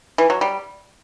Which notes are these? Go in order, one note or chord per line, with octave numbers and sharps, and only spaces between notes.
E3
F#3
G3